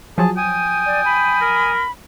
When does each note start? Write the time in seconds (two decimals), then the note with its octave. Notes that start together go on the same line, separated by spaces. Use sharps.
0.18 F3 F#3 G#4 A5
0.37 G5 G#5 D#6
0.86 D5
1.05 B5
1.41 A#4